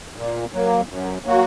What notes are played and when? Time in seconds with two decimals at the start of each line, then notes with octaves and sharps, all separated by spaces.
0.16 A#2
0.53 F#3 A#3
0.89 F#2
1.25 F#3 A#3 F#4